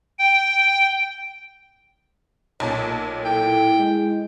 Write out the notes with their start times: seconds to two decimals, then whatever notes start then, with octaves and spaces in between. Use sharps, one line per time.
0.19 G5
2.60 B1 A#2 C#5 A5
3.25 E4 A4 G5
3.78 G#3